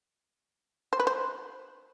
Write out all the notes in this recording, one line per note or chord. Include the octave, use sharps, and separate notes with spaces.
C5
B4
C5